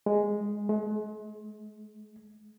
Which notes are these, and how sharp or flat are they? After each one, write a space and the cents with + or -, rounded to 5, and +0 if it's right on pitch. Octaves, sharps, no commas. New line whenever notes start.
G#3 -5
G#3 +40